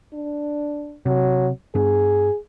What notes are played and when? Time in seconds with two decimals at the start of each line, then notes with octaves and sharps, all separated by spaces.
0.14 D4
1.06 C3 F#3
1.75 G2 B3 D4 G#4